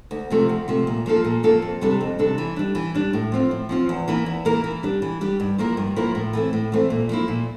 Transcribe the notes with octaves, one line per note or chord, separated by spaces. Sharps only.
D2
C3 F3 A3
D2
C3 F3 A3
A#2
F3 A#3 F4 A4
A#2
F3 A#3 F4 A4
F2
C3 G3 D4 A4
F2
C3 G3 D4 A4
E3
G3 D4
E3
G3 D4
A2
F3 C4 F4
A2
F3 C4 F4
E2
E3 A#3 E4 A#4
E2
E3 A#3 E4 A#4
E3
G3 D4 G4
E3
G3 D4 G4
G2
F3 A#3 E4 A#4
G2
F3 A#3 E4 A#4
A2
E3 A3 C4
A2
E3 A3 C4
A#2
F3 A#3 E4
A#2